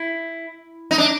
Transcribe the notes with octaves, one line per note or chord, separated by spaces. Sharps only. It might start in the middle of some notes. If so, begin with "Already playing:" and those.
Already playing: E4
D#4
D4